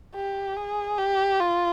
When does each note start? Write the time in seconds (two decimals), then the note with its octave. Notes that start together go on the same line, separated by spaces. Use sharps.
0.15 G4
0.57 G#4
0.98 G4
1.40 F4